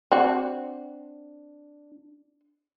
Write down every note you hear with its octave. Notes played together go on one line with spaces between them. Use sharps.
C4 D4 F#4